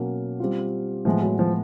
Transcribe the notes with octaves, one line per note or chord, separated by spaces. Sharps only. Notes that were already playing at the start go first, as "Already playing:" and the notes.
Already playing: B2 F#3 A#3 C#4
G3 C4 F4
A2 E3 F3 G#3 B3
F#3
F3